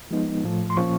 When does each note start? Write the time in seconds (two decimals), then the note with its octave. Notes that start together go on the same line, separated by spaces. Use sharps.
0.11 F3 G#3 B3 D#4
0.44 A2 F3 A3
0.70 C6
0.77 A#2 F3 A#3 C#4 C#6